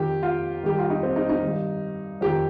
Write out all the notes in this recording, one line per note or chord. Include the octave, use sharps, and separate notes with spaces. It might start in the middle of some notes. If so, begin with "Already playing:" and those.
Already playing: F2 D#3 G4
F4
G2 D#3 G4
F4
D#4
C4
D#4
D#4
G2 D#3
F2 D#3 G4